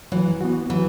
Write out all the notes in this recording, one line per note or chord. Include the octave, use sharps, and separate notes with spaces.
E3 F#3
B3 F#4
E3 F#3